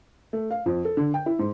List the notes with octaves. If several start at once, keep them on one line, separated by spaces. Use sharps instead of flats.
A3
F5
F2
A4
D3
G5
E4
G#2